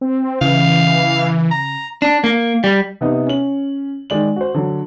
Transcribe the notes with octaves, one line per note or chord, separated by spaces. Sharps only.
C4
C#3 E3 F5
A#5
D4
A#3
G3
C3 B3 D#4
C#4 F#7
D#3 G#3 D5 F#7
F#4 C5
D3 F#3